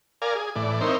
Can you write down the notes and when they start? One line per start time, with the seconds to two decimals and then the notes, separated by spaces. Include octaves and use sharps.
0.22 A#4 D5 F5 G#5
0.35 G#4
0.56 A2 E3 D5
0.81 C4 D#4 E4 A#4 C5 C#5